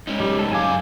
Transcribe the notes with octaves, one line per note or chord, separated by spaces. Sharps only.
G#3 C#4 D#4
G3
A4
F#2 F5 G#5 D6